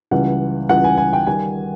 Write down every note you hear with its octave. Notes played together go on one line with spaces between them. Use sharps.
C#2 C#3 E3 G3 F#5
C#2 C#3 E3 G3 F#5
G#5
G#5
G5
D#3 G3 G#5